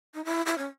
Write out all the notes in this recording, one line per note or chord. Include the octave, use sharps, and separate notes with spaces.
D#4
E4
E4
C#4